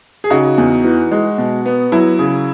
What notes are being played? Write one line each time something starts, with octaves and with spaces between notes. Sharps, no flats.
G#4
C#3 D#4 F#4
E2
E3
G#3
B2
B3
F#3 E4
C#3